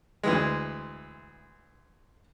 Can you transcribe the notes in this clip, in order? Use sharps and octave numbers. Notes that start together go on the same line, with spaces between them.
D2 E3 G#3